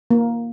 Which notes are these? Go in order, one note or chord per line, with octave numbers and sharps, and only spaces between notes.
A#3